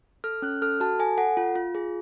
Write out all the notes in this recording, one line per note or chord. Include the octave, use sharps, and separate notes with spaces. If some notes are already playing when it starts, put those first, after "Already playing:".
A4 F6
C#4 F#6
A4 F6
F#4 A5
A4 G#5
A4 F#5
F4
F4
G#4